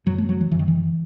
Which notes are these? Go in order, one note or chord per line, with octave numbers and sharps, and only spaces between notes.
F#2 F#3
A3
F#3
E3
F#2 E3
D#3
E3